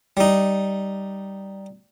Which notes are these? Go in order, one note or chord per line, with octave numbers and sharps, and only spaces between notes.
G3 D#4